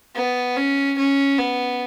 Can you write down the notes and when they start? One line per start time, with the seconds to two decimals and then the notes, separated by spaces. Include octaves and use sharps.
0.16 B3
0.57 C#4
0.98 C#4
1.38 B3